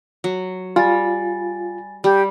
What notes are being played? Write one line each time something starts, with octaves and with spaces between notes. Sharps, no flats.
F#3
G3 F4 G#5 A6
G3 G4